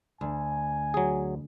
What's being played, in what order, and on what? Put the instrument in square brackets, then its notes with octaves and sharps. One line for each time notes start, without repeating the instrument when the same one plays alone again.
[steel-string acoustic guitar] D2 [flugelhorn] G#5
[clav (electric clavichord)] F#3 G#4